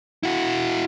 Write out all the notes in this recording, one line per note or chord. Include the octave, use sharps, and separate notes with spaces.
E4 F#4